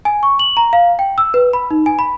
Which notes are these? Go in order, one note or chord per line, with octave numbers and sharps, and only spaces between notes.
G#5
C#6
F#7
A#5
F5
G5
E6
B4
B5
D#4
G#5
B5